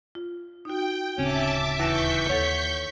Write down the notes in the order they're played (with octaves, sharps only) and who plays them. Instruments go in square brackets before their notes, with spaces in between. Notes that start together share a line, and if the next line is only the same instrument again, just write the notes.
[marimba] F4
[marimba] D#4 F#4 [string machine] G5
[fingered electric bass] D1 C#3 C4 [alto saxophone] C#4 [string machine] E5 A5 D6
[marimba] D#2 A#6 [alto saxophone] E3 [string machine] C#6 G6 B6
[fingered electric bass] D#2 [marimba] A4 F#5 [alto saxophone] C#5